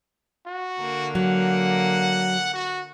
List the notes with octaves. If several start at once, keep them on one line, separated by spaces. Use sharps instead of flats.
F#4
D3 A#3
F#3 F#5
F#4